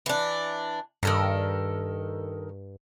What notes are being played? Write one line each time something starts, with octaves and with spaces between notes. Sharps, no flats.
E3 D4
G2 D#3 A4 A#4